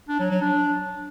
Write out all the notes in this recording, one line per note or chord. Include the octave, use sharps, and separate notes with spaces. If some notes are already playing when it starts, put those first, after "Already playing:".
D4
F#3
F#3
D4